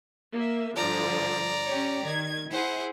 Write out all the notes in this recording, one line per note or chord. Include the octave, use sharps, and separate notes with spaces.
A#3 E5
G2 D3 F3 D5 A#5
C#4 G4 C#5
D#3 G#6
E4 G#4 C5 F#5